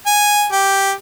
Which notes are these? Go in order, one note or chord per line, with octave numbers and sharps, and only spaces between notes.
G#5
G4